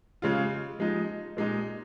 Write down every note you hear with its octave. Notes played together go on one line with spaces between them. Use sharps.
C#3 G#3 F4
F3 G#3 D#4
A#2 G#3 D#4